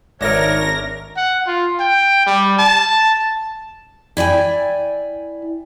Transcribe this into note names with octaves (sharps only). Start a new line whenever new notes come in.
G#1 D4 A#4 C#5 E5 A#6
F#5
F4
G5
G3
A5
E4 D5 G5 G#5